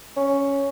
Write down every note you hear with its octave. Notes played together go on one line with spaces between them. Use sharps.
C#4